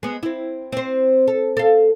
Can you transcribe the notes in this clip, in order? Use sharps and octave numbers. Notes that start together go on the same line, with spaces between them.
G#3 B3
C4 E4
C4 C5
A4
A4 F5